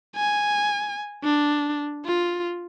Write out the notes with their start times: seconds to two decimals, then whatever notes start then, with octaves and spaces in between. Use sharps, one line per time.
0.16 G#5
1.24 D4
2.06 F4